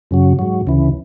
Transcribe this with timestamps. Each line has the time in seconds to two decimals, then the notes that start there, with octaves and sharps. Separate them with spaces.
0.11 F#2 C#3 F#3
0.39 G#2 F#3
0.67 D2 C#3 E3